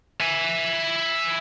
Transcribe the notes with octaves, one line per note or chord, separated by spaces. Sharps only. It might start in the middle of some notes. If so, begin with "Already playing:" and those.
E5 G#5